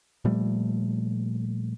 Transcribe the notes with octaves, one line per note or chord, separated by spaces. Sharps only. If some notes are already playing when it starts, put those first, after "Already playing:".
A#2 F3 G3 A3